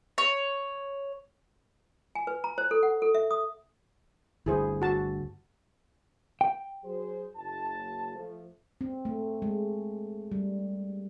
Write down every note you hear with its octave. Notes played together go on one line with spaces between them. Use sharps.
C#5
G#5
B4
A#5
C5
A4
F#5
A4
E5
D#6
G1 D2 G2 E4 G#4 C5
F#4 A5
G5
F#3 G#4 C5
F#1 A5
F3 A3
C4
A3
G#3
G3